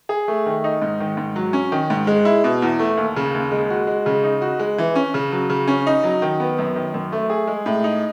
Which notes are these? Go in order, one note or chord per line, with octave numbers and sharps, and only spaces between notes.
G#4
A3
D#3
D#4
G#2
D#3
G#2
F#3
C#4
D#3
G#2
G#3
E4
B2
E2
A3
D#2
C#3
D#2
G#3
F#4
G#3
C#3
D#4
F#4
G#3
E3
C#4
C#3
F#3
C#3
C#4
D#4
F#3
D#3
B3
F#2
D#3
F#2
A3
G#4
G#3
A2
D#4